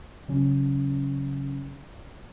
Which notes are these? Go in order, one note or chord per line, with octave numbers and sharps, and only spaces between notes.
C#3 F#3 C#4